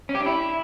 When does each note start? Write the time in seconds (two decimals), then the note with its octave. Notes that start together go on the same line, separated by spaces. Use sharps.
0.09 C#4
0.15 G4
0.20 D4
0.26 E4